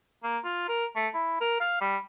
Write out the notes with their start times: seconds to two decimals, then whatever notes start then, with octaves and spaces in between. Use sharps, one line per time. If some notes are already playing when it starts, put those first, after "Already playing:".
0.23 A#3
0.44 F4
0.68 A#4
0.96 A3
1.14 E4
1.41 A#4
1.60 F5
1.81 G3